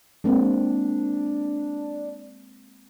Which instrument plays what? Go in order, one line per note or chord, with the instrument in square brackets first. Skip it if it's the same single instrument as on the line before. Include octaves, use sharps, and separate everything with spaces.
[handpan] G#3 A#3 C4 [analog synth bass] D4